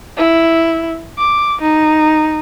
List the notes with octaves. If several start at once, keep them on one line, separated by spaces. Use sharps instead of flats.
E4
D6
D#4